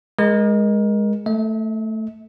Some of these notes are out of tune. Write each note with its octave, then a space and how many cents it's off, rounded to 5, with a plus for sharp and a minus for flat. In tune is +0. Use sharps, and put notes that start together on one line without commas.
G#3 +0 A#4 +25
A3 +5 E5 -45